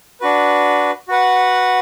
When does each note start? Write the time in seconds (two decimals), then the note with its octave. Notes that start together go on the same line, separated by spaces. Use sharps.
0.21 D4 F#4 B4
1.08 F#4 B4 F#5